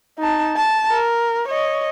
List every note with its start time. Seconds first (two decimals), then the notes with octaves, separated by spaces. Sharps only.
0.18 D#4 A5
0.57 A5
0.89 A#4
1.48 C#5 D#5